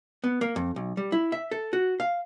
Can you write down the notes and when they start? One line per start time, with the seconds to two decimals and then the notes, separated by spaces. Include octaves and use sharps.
0.24 B3
0.41 A#3
0.56 F2
0.76 B1
0.97 G3
1.12 E4
1.32 E5
1.51 A4
1.73 F#4
2.00 F5